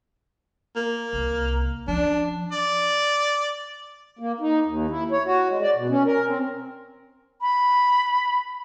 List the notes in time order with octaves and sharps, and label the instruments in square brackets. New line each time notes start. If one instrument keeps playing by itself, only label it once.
[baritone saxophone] A#3
[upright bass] C2
[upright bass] F3 C#4 [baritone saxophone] D4
[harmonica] D5
[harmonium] A#3
D#4
D#2
E4
C#5
F#4
G#3
D5
B2
C#4
A#4
C4
[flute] B5